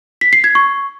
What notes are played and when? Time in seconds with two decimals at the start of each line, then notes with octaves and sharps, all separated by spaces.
0.21 B6
0.33 C7
0.44 G#6
0.55 C#6